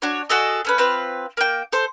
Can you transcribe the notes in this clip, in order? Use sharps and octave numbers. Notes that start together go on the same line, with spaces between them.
D4 F#4 C#5
F#4 G#4 A4 D#5
A3 C#4 B4
C4 F4 B4
A#3 G5
A4 C5